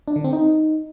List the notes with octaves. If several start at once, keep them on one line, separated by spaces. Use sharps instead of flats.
D4
D3
C4
D#4